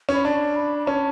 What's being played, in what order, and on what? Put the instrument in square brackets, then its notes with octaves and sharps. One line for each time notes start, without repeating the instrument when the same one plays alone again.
[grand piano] C#4
[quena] B5
[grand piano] D4 [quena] A5
[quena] B5
B5
[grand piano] C#4 [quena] A5